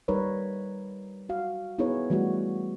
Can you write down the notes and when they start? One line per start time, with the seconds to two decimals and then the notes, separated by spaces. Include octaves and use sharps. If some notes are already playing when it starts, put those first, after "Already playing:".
0.08 G3 D#4 A#4 B4 C#5
1.29 F#4 F5
1.78 B3 D#4 E4 G#4 B4 C#5
2.10 E3 G3 A3 F#4